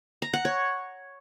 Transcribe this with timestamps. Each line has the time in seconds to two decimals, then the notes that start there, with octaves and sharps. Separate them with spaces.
0.22 A#5
0.33 F#5
0.45 C#5